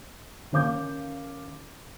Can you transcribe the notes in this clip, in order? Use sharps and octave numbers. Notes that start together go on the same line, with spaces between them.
D#3 C#4 F5 D6 G6